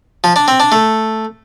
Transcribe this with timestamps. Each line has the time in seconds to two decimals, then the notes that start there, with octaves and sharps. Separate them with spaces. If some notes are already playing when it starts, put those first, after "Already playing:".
0.24 F3
0.36 D4
0.48 C4
0.60 D4
0.72 A3